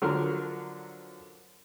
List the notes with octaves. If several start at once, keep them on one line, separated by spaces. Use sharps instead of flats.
D3 F3 F#3 A#4 C6 F6